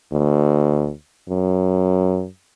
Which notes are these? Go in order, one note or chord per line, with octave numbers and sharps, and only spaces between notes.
D2
F#2